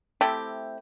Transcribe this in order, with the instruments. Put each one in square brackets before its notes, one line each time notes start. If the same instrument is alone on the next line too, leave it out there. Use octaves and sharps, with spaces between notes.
[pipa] A3 C4 E4 G4